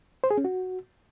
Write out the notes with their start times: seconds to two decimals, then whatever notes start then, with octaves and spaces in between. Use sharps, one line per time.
0.24 C5
0.31 G#4
0.38 C#4
0.45 F#4